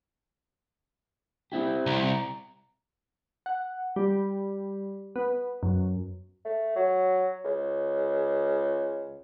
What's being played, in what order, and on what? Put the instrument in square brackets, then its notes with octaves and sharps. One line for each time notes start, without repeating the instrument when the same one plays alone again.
[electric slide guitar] C4 E4 G4
[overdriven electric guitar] C2 [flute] A#5
[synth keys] F#5
G3
B3
F#2
[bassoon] A3
F#3
C#2